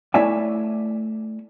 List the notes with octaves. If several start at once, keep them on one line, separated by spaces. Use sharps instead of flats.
A3 E4 C#5 D5 E5 G#5